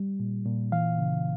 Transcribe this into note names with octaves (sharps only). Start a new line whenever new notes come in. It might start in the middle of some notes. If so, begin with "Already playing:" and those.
Already playing: G3
A#2
A#2
E3 F5
C#3